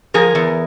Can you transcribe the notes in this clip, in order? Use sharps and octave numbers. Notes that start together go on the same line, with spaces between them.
F3 G#4 A#4
E2